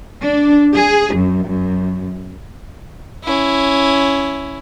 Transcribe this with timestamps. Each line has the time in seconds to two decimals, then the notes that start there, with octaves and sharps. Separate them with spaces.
0.21 D4
0.74 G#4
1.15 F#2
1.48 F#2
3.24 C#4 E4